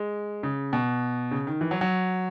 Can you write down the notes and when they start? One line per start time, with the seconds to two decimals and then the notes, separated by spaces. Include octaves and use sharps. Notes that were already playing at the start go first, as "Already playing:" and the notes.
Already playing: G#3
0.43 C#3
0.73 B2
1.31 C#3
1.47 D#3
1.61 E3
1.71 F#3
1.81 F#3